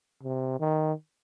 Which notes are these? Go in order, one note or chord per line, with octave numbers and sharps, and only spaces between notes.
C3
D#3